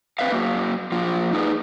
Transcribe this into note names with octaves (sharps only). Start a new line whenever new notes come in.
C4 B4 E5 F5
F#3 A#3
F3 A#3 F4
D#4 G#4 B4